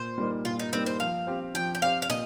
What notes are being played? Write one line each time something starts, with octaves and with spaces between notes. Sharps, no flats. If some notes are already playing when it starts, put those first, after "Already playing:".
Already playing: A#2 C5
G3 A#3 D#4
A#2 F4
D#4
G3 A#3 C4 D#4
C5
F3 F5
C4 G4 C5
F3 G5
G5
C4 G4 C5 F5
F5
A#2 D#5